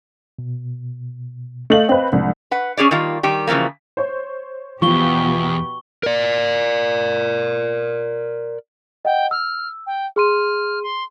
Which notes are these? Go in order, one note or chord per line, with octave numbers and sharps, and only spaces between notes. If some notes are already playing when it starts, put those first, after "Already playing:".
B2
A3 D#5 F5 F#7
C4 B4
C2 F3 G#3 D4
B4 F#5
C#4 G#4 C#5 D5
D#3 G3 A#3 F4
D#3 G3 G4
C#3 E3 F3 G3 A#3
C5 C#5
E2 B2 F3 B3 G4 C#6 G7
A#4 D5
D#5 F#5 G5
E6 F6
G5
G#4 C6 F6 D#7
C6